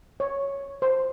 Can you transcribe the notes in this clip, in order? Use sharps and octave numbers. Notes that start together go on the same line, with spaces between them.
C#5
C5